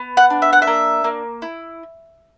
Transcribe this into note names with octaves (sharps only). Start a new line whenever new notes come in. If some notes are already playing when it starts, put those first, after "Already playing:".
Already playing: B3
F#5
D4
E5
F#5
E5
A#3
A#3
E4